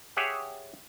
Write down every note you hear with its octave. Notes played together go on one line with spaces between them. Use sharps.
G4 G#4 C#5 E5 F#5